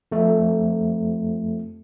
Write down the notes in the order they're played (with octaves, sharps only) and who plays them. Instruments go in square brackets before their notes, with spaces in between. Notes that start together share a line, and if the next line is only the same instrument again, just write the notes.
[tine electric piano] F2 A3